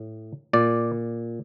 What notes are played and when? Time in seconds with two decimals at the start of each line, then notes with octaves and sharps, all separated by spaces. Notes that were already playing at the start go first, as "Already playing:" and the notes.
Already playing: A2
0.53 A#2 D5